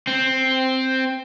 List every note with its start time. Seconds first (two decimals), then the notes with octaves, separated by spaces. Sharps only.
0.07 C4